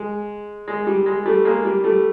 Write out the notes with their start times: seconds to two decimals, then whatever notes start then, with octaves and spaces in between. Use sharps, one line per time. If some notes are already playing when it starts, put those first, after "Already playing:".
Already playing: G#3
0.68 G#3
0.87 G3
1.06 G#3
1.26 G3 A3
1.45 G#3 A#3
1.65 G3
1.84 G3 A3